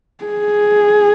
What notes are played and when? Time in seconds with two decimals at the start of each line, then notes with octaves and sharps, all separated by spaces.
0.24 G#4